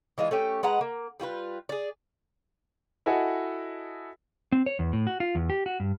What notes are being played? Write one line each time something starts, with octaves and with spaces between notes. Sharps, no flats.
E3 G#3 D4 F4
A3 C#4 G4
G#3 B4 F#5 A#5
A#3
G3 F4 F#4 B4
G#4 D5
E4 F#4 A4 D#5 F#5 G#5
C4
C#5
E2
A2
F#4
F4
E2
G4
F#4
G2